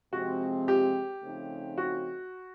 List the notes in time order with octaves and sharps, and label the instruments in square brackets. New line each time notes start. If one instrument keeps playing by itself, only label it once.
[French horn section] C3 F3 G#3 C4 [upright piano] F#4
[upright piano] G4
[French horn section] C#3 F3 A3 C4 D#4
[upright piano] F#4